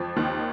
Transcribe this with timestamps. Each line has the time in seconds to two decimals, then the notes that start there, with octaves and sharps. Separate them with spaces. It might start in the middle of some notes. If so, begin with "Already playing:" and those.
Already playing: F2 F3
0.16 D#2 D#3